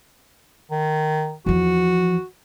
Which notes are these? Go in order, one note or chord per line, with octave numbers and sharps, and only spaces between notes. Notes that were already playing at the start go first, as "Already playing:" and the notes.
D#3
E2 F3 F#4